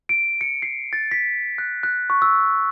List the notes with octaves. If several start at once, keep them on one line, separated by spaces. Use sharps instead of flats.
D7
C#7
C7
A6
B6
F#6
F#6
C#6
E6